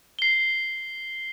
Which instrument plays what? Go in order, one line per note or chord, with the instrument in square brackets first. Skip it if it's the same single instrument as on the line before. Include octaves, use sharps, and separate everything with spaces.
[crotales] C7 G7